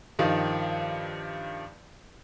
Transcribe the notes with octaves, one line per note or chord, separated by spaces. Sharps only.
G2 D#3 F3